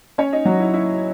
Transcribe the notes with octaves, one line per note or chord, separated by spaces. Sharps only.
C#4 C#5
D#4 D#5
F#3 F#4
E4
E4